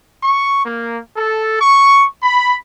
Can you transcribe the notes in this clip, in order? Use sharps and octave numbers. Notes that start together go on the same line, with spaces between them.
C#6
A#3
A4
C#6
B5